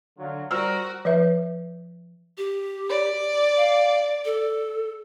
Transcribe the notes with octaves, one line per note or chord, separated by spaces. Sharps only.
D3 F#3 F4
G3 F#4 A#4 C5 E6 F6
F3 B4 E5
G4
D5
F5
A4